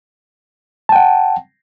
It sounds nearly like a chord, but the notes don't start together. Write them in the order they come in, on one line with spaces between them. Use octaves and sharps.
A5 G5 F#5